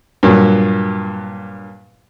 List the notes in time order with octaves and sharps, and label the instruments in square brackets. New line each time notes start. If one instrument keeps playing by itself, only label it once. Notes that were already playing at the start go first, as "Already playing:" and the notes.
[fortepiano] G2 A#2 F#3